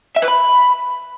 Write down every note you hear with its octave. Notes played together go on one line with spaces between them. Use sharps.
E5
B4
B5